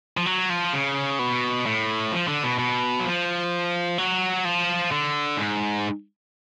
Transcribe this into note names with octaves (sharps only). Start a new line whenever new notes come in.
F3
F#3
F3
C#3
B2
A2
F3
D3
B2
B2
F#3
F3
F#3
F3
D3
G#2